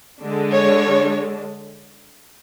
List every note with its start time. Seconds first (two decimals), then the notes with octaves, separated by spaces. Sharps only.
0.22 D3 G#3 D4
0.51 C#5